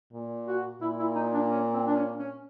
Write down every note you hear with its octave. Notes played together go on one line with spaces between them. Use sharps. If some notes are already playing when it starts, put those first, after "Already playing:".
A#2
F#4
A#2 E4
E4
D#4
D4
C#4
C4
D4
C#4
C#4